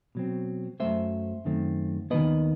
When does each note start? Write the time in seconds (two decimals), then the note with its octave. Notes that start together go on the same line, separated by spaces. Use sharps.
0.15 B2 F#3 C4
0.80 F#2 F#3 A3 C4 C5 E5
1.45 F#2 D#3 A3 C4
2.10 D#2 D#3 F#3 B3 B4 D#5